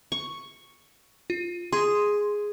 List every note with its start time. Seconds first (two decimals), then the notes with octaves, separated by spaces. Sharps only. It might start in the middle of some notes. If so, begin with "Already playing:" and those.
0.12 C#6
1.30 F4
1.73 G#4 C6